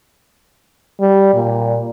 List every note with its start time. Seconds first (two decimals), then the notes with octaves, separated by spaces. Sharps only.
1.00 G3
1.34 A#2